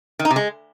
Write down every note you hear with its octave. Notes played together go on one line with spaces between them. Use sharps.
D#3
D#4
C3
G#3